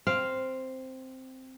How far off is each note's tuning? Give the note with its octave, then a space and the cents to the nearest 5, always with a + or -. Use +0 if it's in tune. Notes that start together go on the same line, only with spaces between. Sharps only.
C4 +0 F5 +0